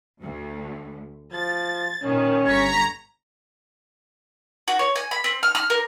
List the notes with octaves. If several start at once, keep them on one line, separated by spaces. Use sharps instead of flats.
D2
F3 A6
A#2 D#3 C#4
G1 A#5 C#6 G#6 B6
F#4
C#5
G#5
B5
C4
F6
F6
A#4